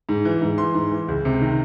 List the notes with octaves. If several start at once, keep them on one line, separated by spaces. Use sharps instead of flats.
G#2
E3
G#2
E3 C6
G#2
E3
C#2
C3
D#3